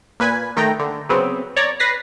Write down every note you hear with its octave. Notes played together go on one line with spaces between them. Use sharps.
A#2 B4 G#5 B5 G#6
D#3 A3 G5 A#5
D3
C#3 F#3 B3 C4
C#5 D5 A#5
B4 A#6 C7